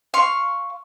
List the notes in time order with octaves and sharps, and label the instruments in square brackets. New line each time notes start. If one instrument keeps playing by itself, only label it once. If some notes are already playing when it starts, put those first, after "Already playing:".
[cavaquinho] F5 C6 C#6